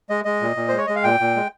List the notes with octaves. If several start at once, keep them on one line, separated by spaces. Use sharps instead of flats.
G#3 D#5
G#3 D#5
A#2
A#2
C5
G#3 C#5
G#3 D#5
F5
A#2 G5
A#2
G#3